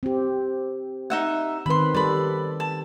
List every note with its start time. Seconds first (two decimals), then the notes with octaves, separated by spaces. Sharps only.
0.03 C4 G4
1.10 D#4 E5 F#5
1.66 D#3 C4 B4 B5 C6
1.95 G3 A4 B4 D5 B5
2.60 A5